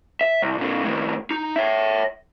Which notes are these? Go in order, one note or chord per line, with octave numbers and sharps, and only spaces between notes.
E5
C2
A#2 D3
A2 D#3
D#4
C#5 E5